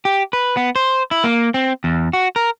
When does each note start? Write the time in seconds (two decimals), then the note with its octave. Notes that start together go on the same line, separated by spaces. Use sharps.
0.05 G4
0.33 B4
0.57 B3
0.76 C5
1.11 E4
1.24 A#3
1.54 C4
1.84 E2
2.13 F#4
2.36 A#4